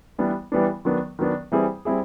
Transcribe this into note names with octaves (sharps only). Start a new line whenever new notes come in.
E3 G3 B3 D4
E3 G3 B3 D4
D#3 F#3 B3 D4
D#3 F#3 B3 D4
E3 G3 C4 E4 G#4
G3 C4 E4 G#4